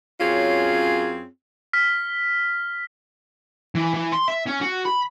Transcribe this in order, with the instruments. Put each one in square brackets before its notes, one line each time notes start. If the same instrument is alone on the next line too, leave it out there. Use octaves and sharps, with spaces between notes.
[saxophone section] F#2 C4 C#4 F4 G#4 C#5
[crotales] F6 B6
[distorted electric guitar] E3
E3
C6
E5
C#4
F#4
B5